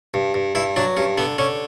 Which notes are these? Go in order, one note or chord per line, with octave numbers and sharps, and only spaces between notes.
G2
G2
G2 E4
F#3 D4
G2 C#4
D3 B3
D3 C#4